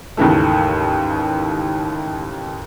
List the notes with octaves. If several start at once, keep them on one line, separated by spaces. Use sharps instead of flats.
D#2 G#2 C#3 E3 A3